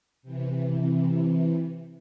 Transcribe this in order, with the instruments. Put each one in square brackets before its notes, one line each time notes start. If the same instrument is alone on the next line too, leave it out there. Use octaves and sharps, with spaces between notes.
[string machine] C3 E3